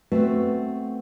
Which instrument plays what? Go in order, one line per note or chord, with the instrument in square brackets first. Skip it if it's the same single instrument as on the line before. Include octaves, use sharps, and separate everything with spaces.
[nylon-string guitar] A3 B3 C4 F#4 B4